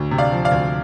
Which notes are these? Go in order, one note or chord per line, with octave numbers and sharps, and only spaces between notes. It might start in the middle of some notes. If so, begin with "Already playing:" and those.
Already playing: D2
C3
D5 F5
F3
D5 F5
D2